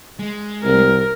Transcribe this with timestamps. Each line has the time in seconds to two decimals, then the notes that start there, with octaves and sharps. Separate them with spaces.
0.19 G#3
0.64 C2 A#4